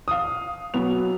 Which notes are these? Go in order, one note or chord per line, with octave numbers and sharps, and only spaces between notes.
F5 D#6
B1 F#3 B3 F7